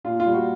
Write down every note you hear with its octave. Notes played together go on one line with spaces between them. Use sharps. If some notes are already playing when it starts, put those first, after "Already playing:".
A#2 F4
F4
G3
F#4